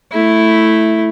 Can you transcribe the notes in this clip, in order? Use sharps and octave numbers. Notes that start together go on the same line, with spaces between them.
A3 E4